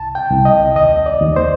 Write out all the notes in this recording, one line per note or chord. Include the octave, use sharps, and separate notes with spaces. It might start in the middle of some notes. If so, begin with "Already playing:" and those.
Already playing: C2 A5
G5
C2
D#5
D#2 D#5
D5
D#2
C5